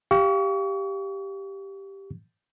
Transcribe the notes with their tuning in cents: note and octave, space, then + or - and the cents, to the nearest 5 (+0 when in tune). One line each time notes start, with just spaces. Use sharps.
G4 +0 F5 -10 C#6 +35